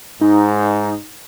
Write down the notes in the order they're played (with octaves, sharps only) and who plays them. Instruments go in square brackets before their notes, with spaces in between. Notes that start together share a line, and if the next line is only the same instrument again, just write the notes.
[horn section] G#2 [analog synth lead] D#4